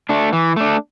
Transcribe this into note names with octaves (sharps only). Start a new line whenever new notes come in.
A3 D4
E3
A3 D4